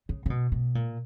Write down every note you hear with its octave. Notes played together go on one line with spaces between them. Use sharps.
C#3
C#3
B2
B2
A#2